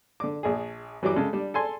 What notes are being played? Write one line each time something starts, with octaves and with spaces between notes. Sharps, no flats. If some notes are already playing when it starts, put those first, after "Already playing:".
D3 D6
A#1 G#4
E3 F#3 G3 D6
C#3 G#3 A4
G3 D4
A4 G#5 C6